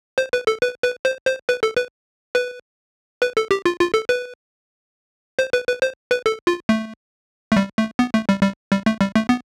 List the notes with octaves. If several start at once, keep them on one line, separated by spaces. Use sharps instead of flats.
C5
B4
A4
B4
B4
C5
C5
B4
A4
B4
B4
B4
A4
G4
F4
F4
A4
B4
C5
B4
B4
C5
B4
A4
F4
A3
A3
G3
A3
B3
A3
G3
G3
G3
A3
G3
A3
B3